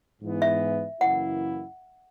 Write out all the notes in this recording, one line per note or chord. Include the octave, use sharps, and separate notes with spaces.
G#2 E3 B3
E5
F#2 C#3 E3 A#3 E4 F#5